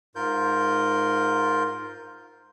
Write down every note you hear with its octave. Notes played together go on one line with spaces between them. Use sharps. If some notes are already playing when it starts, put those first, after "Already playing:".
G#2 F4 A#4 G6